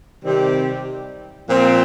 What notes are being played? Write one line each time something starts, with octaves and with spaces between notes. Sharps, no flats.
C3 D#3 G3 C4 G4
A#2 F3 C4